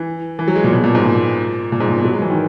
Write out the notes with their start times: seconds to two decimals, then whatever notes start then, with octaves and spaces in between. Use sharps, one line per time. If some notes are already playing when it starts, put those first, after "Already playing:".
Already playing: E3
0.39 E3
0.48 F#3
0.55 G#3
0.64 A#2
0.72 B2
0.84 A#2
0.95 G#2
1.05 A#2
1.72 A#2
1.80 G#2
1.89 A#2
1.97 B2
2.05 F#3
2.14 G#3
2.22 E3
2.30 D#3